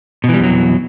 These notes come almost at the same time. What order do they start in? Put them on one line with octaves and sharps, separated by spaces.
B2 E3 G3 F2 F#3